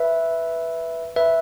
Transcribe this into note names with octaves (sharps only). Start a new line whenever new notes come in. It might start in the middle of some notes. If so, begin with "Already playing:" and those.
Already playing: B4 E5
B4 E5